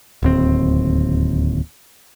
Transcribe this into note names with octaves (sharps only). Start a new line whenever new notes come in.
D1 D#2 C4